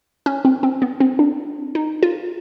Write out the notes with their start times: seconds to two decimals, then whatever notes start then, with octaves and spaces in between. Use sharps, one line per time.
0.26 C#4
0.45 C4
0.63 C4
0.82 B3
1.00 C4
1.19 D4
1.75 D#4
2.03 F4